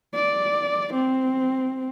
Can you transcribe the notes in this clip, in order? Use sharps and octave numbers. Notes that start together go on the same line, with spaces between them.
D5
C4